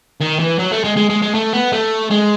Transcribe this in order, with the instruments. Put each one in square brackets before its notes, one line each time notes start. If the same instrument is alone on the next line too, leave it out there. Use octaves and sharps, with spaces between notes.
[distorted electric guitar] D#3
E3
F#3
A3
G#3
G#3
G#3
G#3
A3
B3
A3
G#3